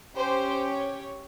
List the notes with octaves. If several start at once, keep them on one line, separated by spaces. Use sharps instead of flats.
C#4 G4 C5
C#5